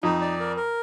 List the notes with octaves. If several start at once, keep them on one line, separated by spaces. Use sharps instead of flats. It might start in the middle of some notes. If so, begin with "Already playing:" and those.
F2 D#4
D5
A#4
A#4